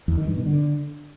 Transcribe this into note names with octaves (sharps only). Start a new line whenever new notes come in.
E2
D#3
G2
B2
D3